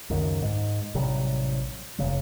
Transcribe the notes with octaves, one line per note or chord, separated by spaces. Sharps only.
C#2 F#2 D#3
G#2
A1 C3 F#3 G3
F#1 C#3 F#3